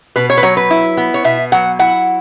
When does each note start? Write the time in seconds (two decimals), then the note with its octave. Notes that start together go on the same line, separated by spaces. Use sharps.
0.16 B2 B4
0.30 C#5
0.37 B4
0.43 F#3 C#5
0.57 B4
0.71 E4
0.97 B3
1.14 C#5
1.24 B2 E5
1.52 F#3 F#5
1.79 E4 F#5